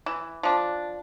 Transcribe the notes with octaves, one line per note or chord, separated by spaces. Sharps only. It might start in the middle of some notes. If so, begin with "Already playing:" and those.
E3
F3 D4